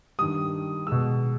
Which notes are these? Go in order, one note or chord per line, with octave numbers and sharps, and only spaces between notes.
G2 D#3 G3 D#6
B2 G#3 E6